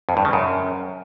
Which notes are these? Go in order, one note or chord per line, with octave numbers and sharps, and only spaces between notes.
F2
G2
C#3
F#2